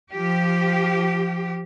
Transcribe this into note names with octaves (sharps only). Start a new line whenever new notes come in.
F3 G4